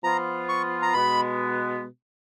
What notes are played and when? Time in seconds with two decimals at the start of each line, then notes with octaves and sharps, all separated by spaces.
0.03 F3 B3 F4 A#5
0.49 C#6
0.82 A#5
0.94 B2 G#3 B3 B5